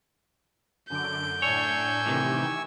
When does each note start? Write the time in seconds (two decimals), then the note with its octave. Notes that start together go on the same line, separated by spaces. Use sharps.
0.90 F#2 D3 G6 D7
1.42 A2 D4 C#5 G#5 C#6 E6
2.06 A2 C3 D#3 E3 G4